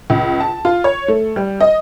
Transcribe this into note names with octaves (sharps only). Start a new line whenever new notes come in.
C#2
A5
F4
C#5
A3
G3
D#5